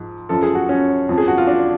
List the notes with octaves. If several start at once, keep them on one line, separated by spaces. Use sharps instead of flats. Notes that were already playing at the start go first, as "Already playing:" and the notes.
Already playing: G#2 F3
F#2 F3 A4
G#4
F#4
C#4
F2 F3
G#4
F#4
F4
D4